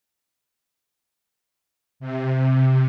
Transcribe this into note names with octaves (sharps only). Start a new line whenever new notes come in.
C3